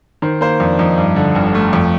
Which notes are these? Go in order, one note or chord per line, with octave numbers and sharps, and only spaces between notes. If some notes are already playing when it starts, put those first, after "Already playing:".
D#3 C5
A#3 C5
F2 D4
F2 D#4
G2
D3
G1
A3
F2